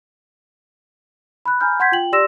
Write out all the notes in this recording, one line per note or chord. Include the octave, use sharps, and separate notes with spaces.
B5 F#6
G#5 A#5 B5 F6 G6
F#5 C6 G6 G#6 B6
F4 G5 F#7
G4 D5 C6 E6 A#6 E7